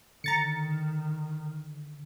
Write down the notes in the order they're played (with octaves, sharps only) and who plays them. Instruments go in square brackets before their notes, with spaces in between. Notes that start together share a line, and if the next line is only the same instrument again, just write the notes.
[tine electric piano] D3 [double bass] D#3 [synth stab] A#5 A6 C#7